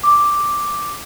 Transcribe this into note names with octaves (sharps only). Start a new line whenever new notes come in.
D6